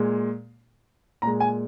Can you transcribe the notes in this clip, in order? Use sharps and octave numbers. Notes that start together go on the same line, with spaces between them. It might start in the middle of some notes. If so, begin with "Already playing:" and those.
Already playing: A#2 G#3
A#2 G#3 A#5
G#5